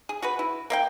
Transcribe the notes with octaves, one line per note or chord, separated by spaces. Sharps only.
G#4
F#4 G#4 B4
E4
A#3 E5 G5